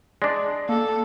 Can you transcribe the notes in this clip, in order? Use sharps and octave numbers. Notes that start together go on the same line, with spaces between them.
G#3 D4 D5
A#3 A4